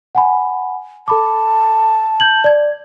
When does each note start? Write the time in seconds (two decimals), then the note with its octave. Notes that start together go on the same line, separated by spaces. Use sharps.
0.15 F#5 G#5 B5
1.08 A4 A5 B5 D6
2.20 G6 G#6 F#7
2.44 D5 G#6